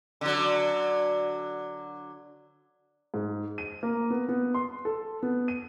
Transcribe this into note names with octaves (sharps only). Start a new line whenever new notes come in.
D3 F#3
G#2
D#7
A#3
B3
B3
C6
A4
B3
D#7